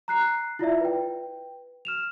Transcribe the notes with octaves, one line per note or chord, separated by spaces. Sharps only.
A#5 F#6 C7
E4 F4 D5 E5
B4 G5
F6 E7 F7